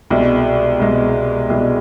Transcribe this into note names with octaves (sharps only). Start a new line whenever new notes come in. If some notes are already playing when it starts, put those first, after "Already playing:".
C2 B2 G#3
C2 B2 G#3
C2 B2 G#3